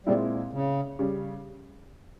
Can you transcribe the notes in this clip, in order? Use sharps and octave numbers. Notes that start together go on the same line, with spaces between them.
A#2 G3 G#3 C4 E4
C#3
C#3 G3